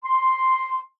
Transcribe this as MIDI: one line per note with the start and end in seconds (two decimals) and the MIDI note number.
0.05 0.81 84